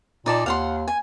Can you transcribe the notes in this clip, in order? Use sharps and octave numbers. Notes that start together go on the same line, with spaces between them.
A#2 D#4 D5 A5
D#2 F5 F#5 C6
G#5